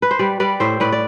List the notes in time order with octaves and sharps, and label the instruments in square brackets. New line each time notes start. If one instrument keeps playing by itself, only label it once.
[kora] B4
C5
G3 B4 D5
G3 B4 D5
A2 C5 E5
A2 B4 D5
D5